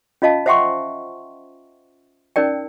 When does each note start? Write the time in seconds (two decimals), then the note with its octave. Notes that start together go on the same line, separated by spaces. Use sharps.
0.22 C#4 F4 D#5 F5 A5
0.46 C5 E5 F#5 G5 C6 C#6
2.36 C#4 D#4 A#4 D5 G5